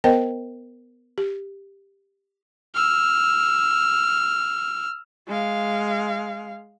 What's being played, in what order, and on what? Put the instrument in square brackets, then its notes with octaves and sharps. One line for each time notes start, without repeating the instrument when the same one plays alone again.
[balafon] B3 A#4 C5 D#5 G5
G4
[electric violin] E6 F6
[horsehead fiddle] G#3 F5